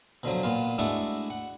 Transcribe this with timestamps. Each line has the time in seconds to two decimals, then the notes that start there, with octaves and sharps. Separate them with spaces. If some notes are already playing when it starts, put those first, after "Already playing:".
0.23 B2 D3 F3 F#3
0.43 A#2 B3 F4
0.78 G#3 A3 D4 E4 F#4 A4
1.30 F#5